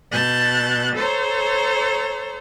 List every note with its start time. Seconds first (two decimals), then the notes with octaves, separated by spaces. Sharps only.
0.11 B2 A5 F#6 G6 A6
0.95 A4 C5 C#5 A#5